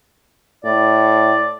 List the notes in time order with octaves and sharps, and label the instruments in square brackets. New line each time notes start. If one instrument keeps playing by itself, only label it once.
[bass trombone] A2 [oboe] D5